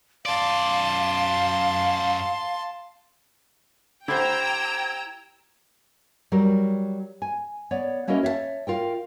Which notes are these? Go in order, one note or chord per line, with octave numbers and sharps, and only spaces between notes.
F#2 D5 F5 A5 C6
D3 E4 G4 C5 G5 A#5 E6 G#6
F#3 G3 A#4
G#5
B3 C#5 D5
A#3 C#4 E4 F#4 A#4 D#5
C#5 E5 F5 A5
F4 A#4 G5